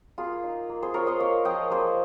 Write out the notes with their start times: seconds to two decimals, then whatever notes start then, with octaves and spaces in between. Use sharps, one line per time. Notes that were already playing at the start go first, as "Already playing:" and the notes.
0.18 A#3 F4 G#4
0.44 D#4
0.69 A#3
0.83 G#4 C5
0.94 F4 A#4 C#5
1.07 C5 D#5
1.20 A#3 C#5 F5
1.45 F3 D#5 G5
1.70 A#3 G#4 C5